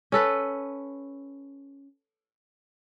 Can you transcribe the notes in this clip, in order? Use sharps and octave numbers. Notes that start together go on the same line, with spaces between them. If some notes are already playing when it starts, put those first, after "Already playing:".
C#4 A4 B4